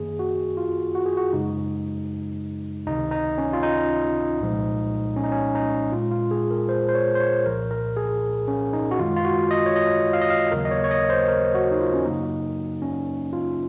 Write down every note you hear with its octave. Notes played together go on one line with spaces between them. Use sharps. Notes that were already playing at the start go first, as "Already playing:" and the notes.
Already playing: F#2 D#3 A#3 G#4
F#4
F4
F#4
G#4
F#4
F#2 C#3 G#3 D#4
C#2 C3 D#3 D#4
D#4
C#4
F4
D#4
C2 A#2 F3 G#3
C#4
D#4
C#4
D#4
A#2 G#3 F4
F4
G#4
A#4
C5
C5
C#5
C5
C#5
C2 A#2 F3 A#4
A#4
G#4
C#4
D#4
F#4
F#2 D#3 G#3 F4
F4
F#4
D#5
C#5
D#5
F5
D#5
F5
D#2 C#3 F#3 A#3 A#4
D#5
C#5
C#5
D#5
C5
A#4
F#4
D#4
F4
C#4
F#2 C#3 F#3 A#3 D#4
C#4
F4